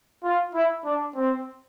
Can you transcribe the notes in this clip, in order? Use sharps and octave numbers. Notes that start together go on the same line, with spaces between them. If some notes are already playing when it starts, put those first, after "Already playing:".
F4
E4
D4
C4